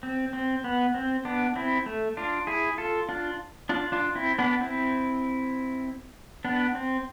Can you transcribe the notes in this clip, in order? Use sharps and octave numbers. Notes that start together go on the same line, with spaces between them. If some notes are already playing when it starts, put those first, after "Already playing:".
C4
C4
B3
C4
B3 D4
C4 E4
A3
D4 F4
E4 G#4
F4 A4
D4 F4
D4 F4
D4 F4
C4 E4
B3 D4
C4 E4
B3 D4
C4